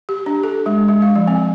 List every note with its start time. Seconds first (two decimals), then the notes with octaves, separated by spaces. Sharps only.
0.09 G4
0.26 D4
0.43 A4
0.66 G#3
0.88 G#3
1.02 F5
1.16 F3
1.27 C4